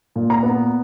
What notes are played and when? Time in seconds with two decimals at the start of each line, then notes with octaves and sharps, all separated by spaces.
0.16 A#2
0.30 A#5
0.43 B3